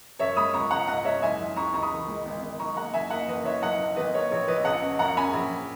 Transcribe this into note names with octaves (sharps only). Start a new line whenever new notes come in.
F#2 C#5 E5
G#3 B5 D#6
C#2 A#5 C#6
C#2 F#5 A#5
G#2 D#5 F#5
G#2 C#5 E5
F#1 E5 G#5
F#1
C#2 A#5 C#6
C#2 A#5 C#6
B5 D#6
E1
G#3
G#1
G#1
B1 A#5 C#6
A#3 F#5 A#5
F#1 E5 G#5
A#3 D#5 F#5
F#1 B4 D#5
F#1 C#5 E5
B1 D#5 F#5
B1
G#1 B4 D#5
A#3 C#5
A#1 C#5
A#1 B4 D#5
C#2 D#5 F#5
C#4
F#2 F#5 A#5
C#4 G#5 B5
A#1